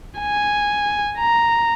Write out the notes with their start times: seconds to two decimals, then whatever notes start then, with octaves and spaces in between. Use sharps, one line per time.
0.20 G#5
1.18 A#5